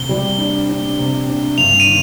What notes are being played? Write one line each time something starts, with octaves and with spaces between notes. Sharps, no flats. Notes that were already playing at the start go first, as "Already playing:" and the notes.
Already playing: C3 G7
G3
D4
D4
C3
D4
G2 F7
D#7
D#3